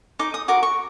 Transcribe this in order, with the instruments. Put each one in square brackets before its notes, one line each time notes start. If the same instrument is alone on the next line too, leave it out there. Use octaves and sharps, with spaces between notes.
[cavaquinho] D#4 D6
D#6
F#4 A#4 D6
C#6